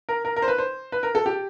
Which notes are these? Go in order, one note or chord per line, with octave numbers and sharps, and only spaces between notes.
A#4
A#4
A#4
C5
B4
C5
B4
A#4
A4
G4